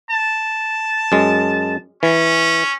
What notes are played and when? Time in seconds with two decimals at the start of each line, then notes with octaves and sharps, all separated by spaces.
0.11 A5
1.12 F#2 G#3
2.03 E3 C#4